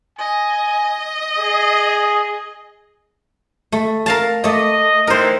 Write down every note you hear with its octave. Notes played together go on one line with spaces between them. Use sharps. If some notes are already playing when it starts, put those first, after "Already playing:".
D#5 G#5
G#4
A3
A#4 F5 A5
A3 D5 D#5
E3 C4 D#4 A#4 C5